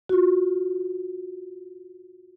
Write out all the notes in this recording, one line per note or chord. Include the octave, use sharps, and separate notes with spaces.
F4 F#4